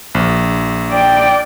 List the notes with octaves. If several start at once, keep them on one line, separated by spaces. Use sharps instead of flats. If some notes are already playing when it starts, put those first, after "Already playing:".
A#1
D5 G5